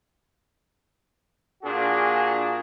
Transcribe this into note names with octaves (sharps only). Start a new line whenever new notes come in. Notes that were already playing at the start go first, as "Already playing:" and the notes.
A#2 A#3 D4 F#4 G#4